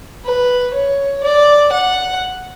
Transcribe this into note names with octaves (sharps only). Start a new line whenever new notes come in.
B4
C#5
D5
F#5